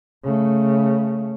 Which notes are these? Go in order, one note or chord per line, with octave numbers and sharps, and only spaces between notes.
C#3 A3